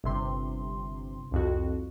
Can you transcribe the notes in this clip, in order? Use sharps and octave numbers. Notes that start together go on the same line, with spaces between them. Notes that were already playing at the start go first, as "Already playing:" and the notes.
G1 C3 C6
C2 F2 F#4